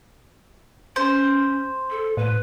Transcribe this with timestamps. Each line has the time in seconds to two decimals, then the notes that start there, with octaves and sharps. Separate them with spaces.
0.96 C#4 C5
1.91 A4
2.17 A2 B4